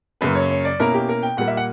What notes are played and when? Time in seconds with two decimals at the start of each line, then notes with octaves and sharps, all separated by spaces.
0.21 F#2 C#3 F#3 A#3 B4
0.35 C#5
0.50 C#5
0.65 D5
0.79 B2 A#3 C#4 E4 A#4
0.94 G4
1.09 A#4
1.23 G5
1.37 A#2 G3 A#3 F#5
1.47 E5
1.57 F#5